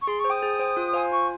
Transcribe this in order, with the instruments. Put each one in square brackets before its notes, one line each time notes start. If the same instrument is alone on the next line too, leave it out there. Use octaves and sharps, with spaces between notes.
[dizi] C#6
[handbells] G#4 [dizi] C6
[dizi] C#6
[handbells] C5
[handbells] G5 [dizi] D#6
[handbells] G#4
C5 G5
F4
C5 F5 G#5
[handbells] F4 [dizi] C#6